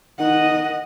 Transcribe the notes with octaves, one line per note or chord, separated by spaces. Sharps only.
D#3 D#5 F#5